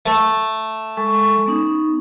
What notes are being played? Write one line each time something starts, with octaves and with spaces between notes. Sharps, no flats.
A3
G#3 A4 C#6
B3 C#4 D#4